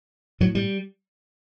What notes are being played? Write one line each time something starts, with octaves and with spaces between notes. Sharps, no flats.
A2 F#3
G3